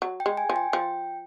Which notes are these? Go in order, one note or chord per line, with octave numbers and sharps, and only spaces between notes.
F#3
G5
G#3
G#5
F3
G5
F3 G5